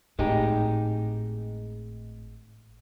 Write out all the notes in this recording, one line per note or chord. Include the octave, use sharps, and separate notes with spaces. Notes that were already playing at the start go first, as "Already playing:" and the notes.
G#1 A2 G#3 D#4 G4